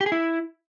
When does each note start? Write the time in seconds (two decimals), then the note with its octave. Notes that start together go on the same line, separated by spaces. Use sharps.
0.01 G4
0.06 G#4
0.12 E4